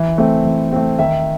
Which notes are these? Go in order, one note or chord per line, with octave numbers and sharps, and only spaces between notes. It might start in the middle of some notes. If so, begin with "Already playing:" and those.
Already playing: E3
A3 C4
E3
A3 C4
D#3 E5